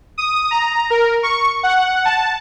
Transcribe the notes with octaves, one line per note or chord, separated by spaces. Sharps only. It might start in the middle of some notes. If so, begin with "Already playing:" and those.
D#6
A#5
A#4
C#6
F#5
A5